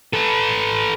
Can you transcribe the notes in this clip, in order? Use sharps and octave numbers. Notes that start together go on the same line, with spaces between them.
A4 B4